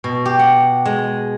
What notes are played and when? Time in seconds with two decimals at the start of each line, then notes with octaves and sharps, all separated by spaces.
0.04 B2
0.25 G4
0.39 F#5
0.85 G#3